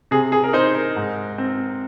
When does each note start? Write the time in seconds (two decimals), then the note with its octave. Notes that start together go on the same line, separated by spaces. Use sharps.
0.11 C3 G#4
0.32 G#4
0.44 A#4
0.53 D#4 C5
0.75 A#4
0.96 G#2
1.38 C4